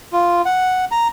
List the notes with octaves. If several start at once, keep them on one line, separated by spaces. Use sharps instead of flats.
F4
F#5
A#5